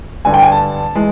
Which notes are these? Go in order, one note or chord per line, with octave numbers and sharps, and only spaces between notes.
G2 D3 G3 G#5
G5
G#5
A5
E3 G#3